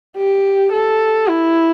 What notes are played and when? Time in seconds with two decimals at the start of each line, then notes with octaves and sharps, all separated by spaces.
0.17 G4
0.72 A4
1.28 E4